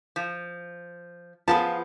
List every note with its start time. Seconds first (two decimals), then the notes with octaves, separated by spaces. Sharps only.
0.16 F3
1.48 F3 B3 F4 G#4 B4 A5